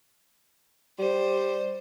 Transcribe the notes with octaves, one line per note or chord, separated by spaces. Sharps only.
G3 C5